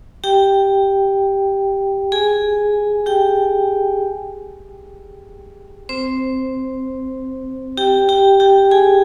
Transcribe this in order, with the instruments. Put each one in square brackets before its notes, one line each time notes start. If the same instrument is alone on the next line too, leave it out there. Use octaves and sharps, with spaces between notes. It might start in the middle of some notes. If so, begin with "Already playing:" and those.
[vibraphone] G4 G5
G#4 G#5
G4 G5
C4 C5
G4 G5
G4 G5
G4 G5
G#4 G#5